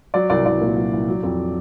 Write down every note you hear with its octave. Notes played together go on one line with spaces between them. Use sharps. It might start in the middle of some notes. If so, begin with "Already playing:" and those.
F#3 D5
C2 D5
C2 D5
A#2
F#3
C2
F#3
F2